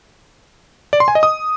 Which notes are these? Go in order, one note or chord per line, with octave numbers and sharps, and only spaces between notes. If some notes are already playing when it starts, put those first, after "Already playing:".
D5
C6
G#5
D#5
D#6